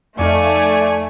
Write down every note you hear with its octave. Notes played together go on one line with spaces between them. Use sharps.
F2 A3 D#4 D5 F5 G#5 C#6